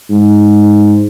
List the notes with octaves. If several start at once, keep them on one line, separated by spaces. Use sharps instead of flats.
G#2